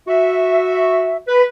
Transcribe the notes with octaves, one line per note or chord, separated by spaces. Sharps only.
F#4 E5
B4